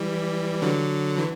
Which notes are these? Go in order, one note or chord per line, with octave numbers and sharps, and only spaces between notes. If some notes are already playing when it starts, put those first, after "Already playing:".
Already playing: E3 G3
D3 F#3
E3